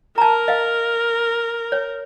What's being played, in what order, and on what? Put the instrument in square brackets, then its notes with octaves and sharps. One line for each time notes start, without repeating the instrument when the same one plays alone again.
[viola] A#4 [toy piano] A5 A#5
[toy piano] D#5 F5
C#5